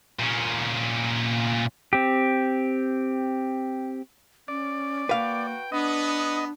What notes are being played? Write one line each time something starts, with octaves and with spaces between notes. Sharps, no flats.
A#2 C#4
C4 G4
C#4 D5
A#3 F#4 B4 F5 G5
B3 D4 D#5